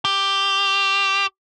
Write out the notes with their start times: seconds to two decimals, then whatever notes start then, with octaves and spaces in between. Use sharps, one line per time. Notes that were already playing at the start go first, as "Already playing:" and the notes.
0.05 G4